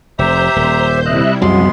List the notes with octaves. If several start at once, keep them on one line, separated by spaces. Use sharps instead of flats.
F1 G4 C5 E5 A#5 G6
D#1
C3 G3 E4 D#5 E5 F#6
C2 F#2 F3 F#3 G#3 B3 C6